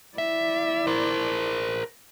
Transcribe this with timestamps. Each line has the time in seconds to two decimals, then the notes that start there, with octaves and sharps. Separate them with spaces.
0.18 E4 D5 E5
0.87 A#4 C5